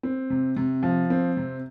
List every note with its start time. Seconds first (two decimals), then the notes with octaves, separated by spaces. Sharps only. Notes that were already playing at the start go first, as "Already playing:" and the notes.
0.03 C4
0.30 C3
0.56 C3
0.83 F3
1.10 C4
1.37 C3